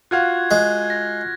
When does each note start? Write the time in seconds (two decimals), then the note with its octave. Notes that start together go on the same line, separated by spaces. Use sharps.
0.11 F4 F#4 F5 F#6 G#6
0.51 G#3
0.90 A#6